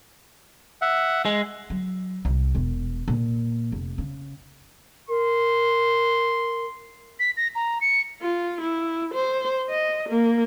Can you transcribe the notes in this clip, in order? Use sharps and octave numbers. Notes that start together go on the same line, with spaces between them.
E5 F#5
G#3
F#3
C2
E1
A#2
F1
C#3
A#4 C6
B6
A#6
A#5
C#7
F4
E4
C5
D#5
A#3